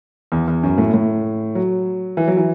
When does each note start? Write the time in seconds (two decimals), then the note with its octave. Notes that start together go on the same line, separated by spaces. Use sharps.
0.32 E2
0.48 E2
0.63 F#2
0.78 A2
0.94 A2
1.55 F#3
2.17 E3
2.28 F#3
2.37 E3